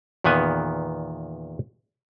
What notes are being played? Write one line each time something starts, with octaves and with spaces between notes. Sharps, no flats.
E2 A#2 D#3 B3 G#5